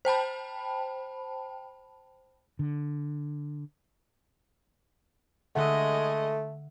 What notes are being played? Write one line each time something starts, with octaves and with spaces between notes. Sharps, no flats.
C5 G5 A5 B5
D3
D3 G#3 A3 D#5 E5 F#5